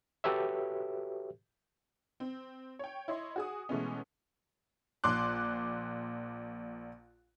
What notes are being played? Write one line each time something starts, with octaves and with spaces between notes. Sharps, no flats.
F#4 G4 A4 B4 C#5 E5
C4
C#5 G5
E4 C#5 D#5 C6
F#4 G#4 D#6
B2 E3 G#3 A3 B3 C#4
A#1 C6 D6 F#6